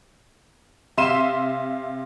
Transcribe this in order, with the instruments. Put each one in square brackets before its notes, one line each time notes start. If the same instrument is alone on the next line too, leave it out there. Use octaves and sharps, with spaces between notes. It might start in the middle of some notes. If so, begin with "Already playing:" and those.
[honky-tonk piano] C3 E5 F5 C6 D#7 E7